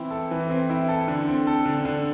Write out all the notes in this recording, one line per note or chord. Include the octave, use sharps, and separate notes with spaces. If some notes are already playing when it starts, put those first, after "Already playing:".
Already playing: E3 C4 E4
A4
E3
C4
E4
A4
D3
C4
A4
D3
D3